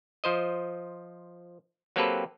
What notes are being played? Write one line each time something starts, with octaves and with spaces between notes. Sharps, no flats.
F3 C5 D#5
F#3 A#3 C4 G4 A4 B4